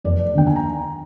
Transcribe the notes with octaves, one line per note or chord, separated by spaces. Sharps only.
F1 D5
D#2 D3 G5
G#5
A#5